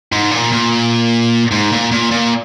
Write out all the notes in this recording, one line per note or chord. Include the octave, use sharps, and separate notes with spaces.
G#2
A#2
A#2
G#2
A#2
A#2
A#2